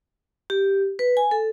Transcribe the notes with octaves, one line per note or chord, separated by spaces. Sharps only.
G4
B4
G#5
A4